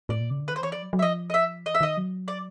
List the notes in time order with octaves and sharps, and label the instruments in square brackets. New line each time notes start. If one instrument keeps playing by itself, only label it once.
[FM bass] A2 [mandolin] D5
[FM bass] A#2
C#3
D3
[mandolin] B4
[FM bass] D#3 [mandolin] C5
[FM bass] E3 [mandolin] C#5
[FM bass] F3 [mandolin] D5
[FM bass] F#3
F#3
[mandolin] E5
[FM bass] F3 [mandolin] D#5
[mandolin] D#5
E5
[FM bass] E3 [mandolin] D#5
[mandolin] E5
[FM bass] D#3 [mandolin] D#5
[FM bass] F#3
[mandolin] D5